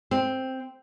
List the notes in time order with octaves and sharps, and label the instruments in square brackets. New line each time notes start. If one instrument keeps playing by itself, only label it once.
[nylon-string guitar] C4